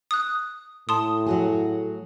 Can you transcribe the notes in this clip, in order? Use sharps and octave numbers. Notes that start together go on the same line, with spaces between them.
D#6 F#6
A2 A5 C6 D#6
F#3 F#4 G#4